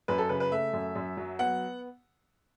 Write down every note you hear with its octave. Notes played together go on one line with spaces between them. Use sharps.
F#2 B4
A4
C#3 B4
B4
A3 E5
F#2
F#2
F#3
B3 F#5